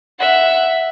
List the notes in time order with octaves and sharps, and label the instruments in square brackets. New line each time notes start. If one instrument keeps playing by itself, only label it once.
[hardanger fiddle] E5 F#5